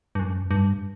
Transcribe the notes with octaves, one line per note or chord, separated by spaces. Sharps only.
G2
F#2
G2